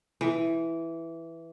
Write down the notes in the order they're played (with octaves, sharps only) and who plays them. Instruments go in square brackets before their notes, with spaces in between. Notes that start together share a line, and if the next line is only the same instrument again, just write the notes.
[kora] E3